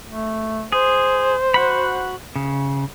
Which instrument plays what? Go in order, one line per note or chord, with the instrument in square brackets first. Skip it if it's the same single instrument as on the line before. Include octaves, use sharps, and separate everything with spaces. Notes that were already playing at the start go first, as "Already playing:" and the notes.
[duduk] A3
[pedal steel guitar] G#4 [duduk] C5
[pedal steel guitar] F#4 F#5 B5
C#3